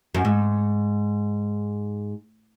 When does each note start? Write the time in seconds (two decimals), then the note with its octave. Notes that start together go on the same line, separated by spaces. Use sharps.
0.15 F#2
0.25 G#2